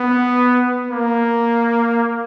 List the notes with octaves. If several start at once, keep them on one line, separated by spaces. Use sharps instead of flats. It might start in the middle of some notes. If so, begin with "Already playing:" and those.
Already playing: B3
A#3